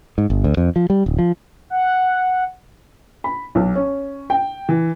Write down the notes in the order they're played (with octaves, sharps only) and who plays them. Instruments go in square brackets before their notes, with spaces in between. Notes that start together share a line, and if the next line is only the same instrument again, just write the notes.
[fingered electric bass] G#2
G1
D2
F2
F3
G3
D1
F3
[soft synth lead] F#5
[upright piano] B5
B1
C#4
G5
E3